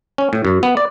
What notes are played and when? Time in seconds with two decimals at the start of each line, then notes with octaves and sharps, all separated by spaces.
0.18 C#4
0.33 A2
0.45 F#2
0.63 B3
0.77 D5